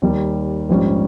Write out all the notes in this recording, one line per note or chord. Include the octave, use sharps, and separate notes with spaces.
D#2 D#3 G3
A#1 G#2 G3 C#4